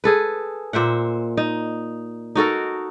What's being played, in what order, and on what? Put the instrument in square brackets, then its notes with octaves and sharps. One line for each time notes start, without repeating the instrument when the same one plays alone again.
[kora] G#4 A4 B4
A#2 C5 E5 F#5
D#4
D#4 F#4 A4 A#4